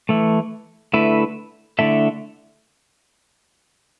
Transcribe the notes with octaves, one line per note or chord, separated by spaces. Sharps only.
E3 A3 E4
D3 A3 E4 B4 E5
D3 A3 E4 A4 E5